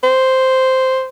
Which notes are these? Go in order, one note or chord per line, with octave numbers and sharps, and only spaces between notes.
C5